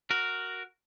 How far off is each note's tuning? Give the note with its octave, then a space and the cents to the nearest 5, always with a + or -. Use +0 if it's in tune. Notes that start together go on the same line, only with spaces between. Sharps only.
F#4 +0 A#4 +0